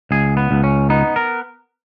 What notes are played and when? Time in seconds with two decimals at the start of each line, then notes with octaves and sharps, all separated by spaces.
0.11 C#2 G#4
0.37 B3
0.51 C#2
0.64 C#4
0.90 B3 D#4
1.16 A#4